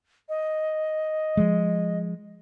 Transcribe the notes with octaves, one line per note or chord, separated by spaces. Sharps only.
D#5
F3 G#3